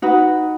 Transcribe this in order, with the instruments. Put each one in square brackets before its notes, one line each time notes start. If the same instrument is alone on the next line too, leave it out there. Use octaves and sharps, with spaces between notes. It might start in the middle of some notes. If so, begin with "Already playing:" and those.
[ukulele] D#4 F#4 B4